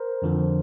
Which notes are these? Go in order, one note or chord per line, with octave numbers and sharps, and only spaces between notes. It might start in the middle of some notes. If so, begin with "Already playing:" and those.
Already playing: A#4 C5
F2 D3 F3